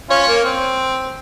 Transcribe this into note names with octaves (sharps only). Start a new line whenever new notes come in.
C#4 F4 C#5
A#3
C4